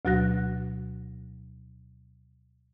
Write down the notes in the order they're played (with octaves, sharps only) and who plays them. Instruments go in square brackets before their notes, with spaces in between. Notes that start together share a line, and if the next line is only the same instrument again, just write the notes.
[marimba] D2 B2 F#3 F#4 F#6 A#6